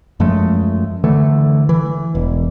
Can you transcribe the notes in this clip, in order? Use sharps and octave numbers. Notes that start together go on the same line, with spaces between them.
F#2 F3 G#3 A3
D3 E3 A3
E3
E1